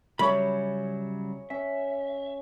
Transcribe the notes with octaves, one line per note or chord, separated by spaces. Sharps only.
C#3 F#3 G3 G#4 C#5 E5 B5
C#4 E5